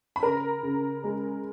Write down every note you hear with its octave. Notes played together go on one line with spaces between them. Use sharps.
B5
C#3 A#4 A#5
C#3
G#3